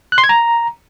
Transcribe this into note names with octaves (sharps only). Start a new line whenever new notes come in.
F#6
C6
G#6
A#5